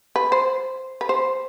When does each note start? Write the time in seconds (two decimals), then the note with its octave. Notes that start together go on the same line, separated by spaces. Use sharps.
0.16 B4
0.32 C5
1.01 B4
1.09 C5